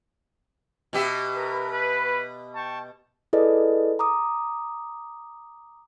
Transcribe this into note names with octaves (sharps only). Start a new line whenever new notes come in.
B2 G4 E5
A#4 B4
B4
G5 A5 C#6
E4 G#4 A4 B4 D5 D#5
A#5 D6 D#6